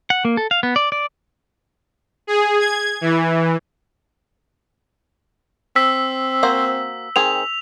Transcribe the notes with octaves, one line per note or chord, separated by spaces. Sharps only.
F#5
A#3
A4
F5
B3
D5
D5
G#4
G#6
E3
C4 E6 B6
A#3 F#4 C5
D#3 C4 G#4 F7